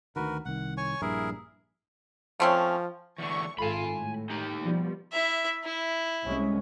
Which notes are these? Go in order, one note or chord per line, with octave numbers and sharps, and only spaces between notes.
D2 D#3 F#4 A#4 B4
C2 D#3 F#5
C#5 G#5 C#6
A#1 G2 E4 G#4 A#4
F3 A3 C4 C#4
E2 D3 C#6
G#1 F4 A4 G#5 B5
A2
D#4 G4
B2 F3 G3
E4 E5
E4
C2 G#3 C#4